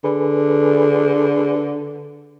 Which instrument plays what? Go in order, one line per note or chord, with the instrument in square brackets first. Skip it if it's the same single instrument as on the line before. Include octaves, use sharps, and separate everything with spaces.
[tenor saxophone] D3 [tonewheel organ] G#4 B4